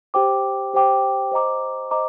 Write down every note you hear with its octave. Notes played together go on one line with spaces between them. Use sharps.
G4 C5 G5 D6
G4 C5 G5 D6
C5 D#5 A#5 D6
C5 D#5 A#5 D6